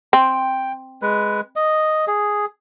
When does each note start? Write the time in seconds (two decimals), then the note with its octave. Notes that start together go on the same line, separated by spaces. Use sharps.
0.13 C4 G5
1.02 G#3 B4
1.56 D#5
2.07 G#4